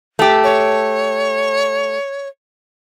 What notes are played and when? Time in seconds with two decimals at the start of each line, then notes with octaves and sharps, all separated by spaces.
0.19 A3 G4
0.44 C#5